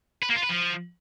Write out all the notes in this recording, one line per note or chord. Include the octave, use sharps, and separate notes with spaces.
B4
A#3
F4
B4
F3